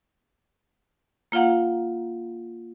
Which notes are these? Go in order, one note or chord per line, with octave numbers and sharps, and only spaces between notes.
A#3 F4 F5 F#5 A#5